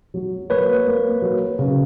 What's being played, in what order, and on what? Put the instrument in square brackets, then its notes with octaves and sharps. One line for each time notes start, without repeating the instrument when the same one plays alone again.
[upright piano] F#3
[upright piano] A#3 [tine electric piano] B4 C#5
[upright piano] A#3
F#3
C#3